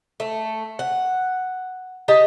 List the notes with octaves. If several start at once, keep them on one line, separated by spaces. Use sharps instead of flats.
A3
F#5
G4 D#5 A5